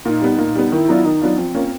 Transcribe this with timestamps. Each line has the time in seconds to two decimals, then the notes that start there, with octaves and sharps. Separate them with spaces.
0.05 A#2 D#4
0.22 G3 B3
0.38 A#2
0.55 G3 B3
0.72 D#3 E4
0.89 F#3 B3 D4 F4
1.05 D#3 D#4
1.21 F#3 B3 D4 F4
1.38 F3 C4
1.55 A#3 C#4 F4